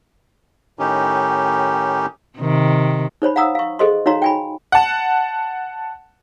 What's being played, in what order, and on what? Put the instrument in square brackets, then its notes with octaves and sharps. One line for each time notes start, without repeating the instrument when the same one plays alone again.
[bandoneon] A2 D#3 C#4 D#4 G4
[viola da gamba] C3 D#3
[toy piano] D#4 C5 C#5 B5
F5 F#5 A#5 D#6 E6
F5 C#6
G#4 A4 C5 D#5 C6
D#4 F#4 C#5 F5 A#5 C6
G5 G#5 B5
[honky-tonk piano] F#5 A5